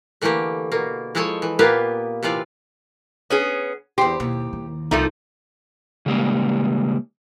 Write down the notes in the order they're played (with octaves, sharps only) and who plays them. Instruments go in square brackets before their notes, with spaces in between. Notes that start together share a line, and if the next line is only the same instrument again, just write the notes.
[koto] D3 E3 A3 A#3 G4
B2 A#3
F3 G#3 E4 A4 C#5 G#5
E3
A#2 A#3 B3 G4 B4 F5
C3 E3 F4 D5
[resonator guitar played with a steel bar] B3 C#4 G#4
[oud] E2 C5 [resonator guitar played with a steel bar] G4
[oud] D#2 [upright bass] B2
[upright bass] D#3
[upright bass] C2 [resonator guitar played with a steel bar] F3 A3 A#3 [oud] D#4
[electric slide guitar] C#3 G3 G#3 A#3